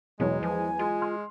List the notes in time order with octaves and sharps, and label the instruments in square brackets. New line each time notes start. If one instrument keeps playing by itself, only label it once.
[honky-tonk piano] E2 E3 F#3 [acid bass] B2 [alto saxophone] G#3 [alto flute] C#5
[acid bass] F3 [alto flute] G#5
[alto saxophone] G#3 [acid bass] F4
[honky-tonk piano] C6 F6